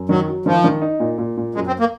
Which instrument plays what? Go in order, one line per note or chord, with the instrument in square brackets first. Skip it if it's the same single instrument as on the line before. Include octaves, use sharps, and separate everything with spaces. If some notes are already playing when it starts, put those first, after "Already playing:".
Already playing: [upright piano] F#2
[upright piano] D#3 [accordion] F#3
[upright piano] F#3
[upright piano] D#3 [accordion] F3
[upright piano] D#3
D#4
A#2
A#2
A#2
[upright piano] F#2 [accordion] G#3
[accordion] C4
A#3